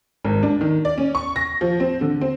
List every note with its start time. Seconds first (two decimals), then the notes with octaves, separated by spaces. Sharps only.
0.24 G#1
0.43 D4
0.61 D#3
0.85 D5
0.98 C#4
1.15 C#6
1.36 A#6
1.61 F3
1.80 C4
2.01 D3
2.21 C4